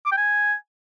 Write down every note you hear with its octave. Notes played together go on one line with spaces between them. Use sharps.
D6
G5
G#5